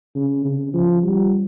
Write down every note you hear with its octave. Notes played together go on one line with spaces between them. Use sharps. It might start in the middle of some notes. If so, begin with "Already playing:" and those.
C#3
C#3
F3
G3